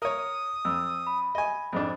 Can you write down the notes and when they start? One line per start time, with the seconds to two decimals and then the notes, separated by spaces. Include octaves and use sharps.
0.02 A#4 C#5 D#6
0.65 F2 E6
1.07 B5
1.35 D#5 G#5
1.73 F2 G#2 D4